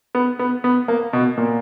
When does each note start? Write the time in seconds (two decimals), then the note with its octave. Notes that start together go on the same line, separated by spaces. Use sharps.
0.15 B3
0.39 B3
0.64 B3
0.88 A#3
1.13 B2
1.37 A#2